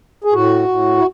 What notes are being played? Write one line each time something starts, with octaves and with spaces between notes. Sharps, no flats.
G#4
A2 F#4
A2
E4